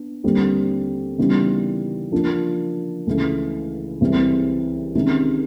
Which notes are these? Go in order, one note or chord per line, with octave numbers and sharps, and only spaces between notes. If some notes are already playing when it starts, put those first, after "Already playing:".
Already playing: B3 D4
D#2 D3 G3 C4
C#3 E3 G3 B3 D#4
F3 A#3 D4 F4
C#2 C#3 E3 A3
C2 C3 E3 G#3 C4
C3 D#3 G#3 C#4